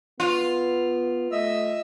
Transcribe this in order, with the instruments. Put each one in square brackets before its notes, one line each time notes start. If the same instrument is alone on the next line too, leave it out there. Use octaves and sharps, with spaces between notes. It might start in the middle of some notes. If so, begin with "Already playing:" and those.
[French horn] B3 [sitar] F4
[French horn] A3 [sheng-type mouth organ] D#5 E5 E6